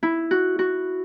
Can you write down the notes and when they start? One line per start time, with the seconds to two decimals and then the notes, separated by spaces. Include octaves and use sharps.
0.03 E4
0.31 F#4
0.59 F#4